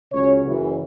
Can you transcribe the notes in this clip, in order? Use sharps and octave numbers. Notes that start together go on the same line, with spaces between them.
C#2 C#3 F#3 C#4 C#5
F#1 F#2 E3